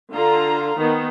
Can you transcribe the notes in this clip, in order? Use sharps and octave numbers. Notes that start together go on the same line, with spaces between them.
D3 F4 A#5
D#3 B3